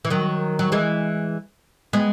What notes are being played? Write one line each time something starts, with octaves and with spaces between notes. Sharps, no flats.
E3
D#3 F#3
F#3
E3 G#3
G#3 B3